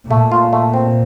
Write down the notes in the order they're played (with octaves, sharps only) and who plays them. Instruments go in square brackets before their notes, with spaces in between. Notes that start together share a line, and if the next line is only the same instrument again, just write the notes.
[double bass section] A#2 [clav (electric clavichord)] A3
[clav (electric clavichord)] F4
A3
C4